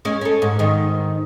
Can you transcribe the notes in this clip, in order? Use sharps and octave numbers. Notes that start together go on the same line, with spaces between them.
G#3 C#4
C#4 A4
G#2
G#2 D#3